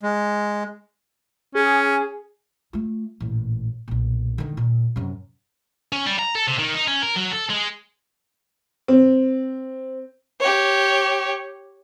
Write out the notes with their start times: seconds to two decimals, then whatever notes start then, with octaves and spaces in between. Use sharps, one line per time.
0.03 G#3
1.55 C#4 G#4
2.73 A3 F4
3.20 A1 A#2
3.88 B1 A#2
4.38 D3 D#3
4.57 A#2
4.96 F#2 C3
5.93 C#4
6.07 G3
6.19 A#5
6.35 A4
6.47 C3
6.59 D#3
6.75 D#4
6.88 C#4
7.02 A#4
7.16 F#3
7.32 A4
7.49 G#3
8.88 C4
10.40 G4 C#5